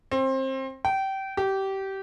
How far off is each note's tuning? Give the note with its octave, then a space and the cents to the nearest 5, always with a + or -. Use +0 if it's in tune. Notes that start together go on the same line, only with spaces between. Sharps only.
C4 +25
G5 -25
G4 -20